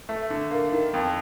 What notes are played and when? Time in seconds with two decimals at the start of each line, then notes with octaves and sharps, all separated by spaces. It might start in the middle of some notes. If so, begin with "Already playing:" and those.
0.09 A3
0.30 D3
0.51 A#3
0.72 D#3
0.94 F2